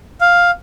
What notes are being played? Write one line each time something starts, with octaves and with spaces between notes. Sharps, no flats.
F5